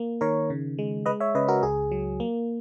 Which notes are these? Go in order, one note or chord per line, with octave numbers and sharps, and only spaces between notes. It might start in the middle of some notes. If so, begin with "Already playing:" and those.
Already playing: A#3
D#3 A#4 C#5
C#3
G#3
G#3 B4 D#5
C#5 E5
C#3 B4 D#5
F#4 A#4
C#2 G#4
F#3
A#3